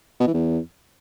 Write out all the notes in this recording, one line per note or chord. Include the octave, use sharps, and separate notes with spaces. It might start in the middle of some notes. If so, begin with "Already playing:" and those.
B2
E3
E2